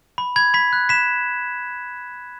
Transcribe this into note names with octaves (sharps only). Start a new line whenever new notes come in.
B5
B5 G#6
B5 B6
F#6
B5 B6 E7